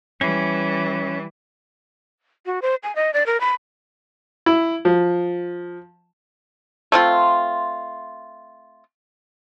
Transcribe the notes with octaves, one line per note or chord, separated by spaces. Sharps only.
E3 G3 C#4
F#4
C5
G#5
D#5
D5
A#4
B5
E4
F3
A3 C4 F4